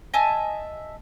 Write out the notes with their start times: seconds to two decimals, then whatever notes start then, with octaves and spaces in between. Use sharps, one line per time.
0.14 D#5 E5 G#5 A5